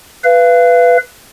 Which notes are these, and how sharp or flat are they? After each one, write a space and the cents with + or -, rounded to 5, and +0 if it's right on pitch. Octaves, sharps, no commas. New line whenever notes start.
B4 +5 F5 -30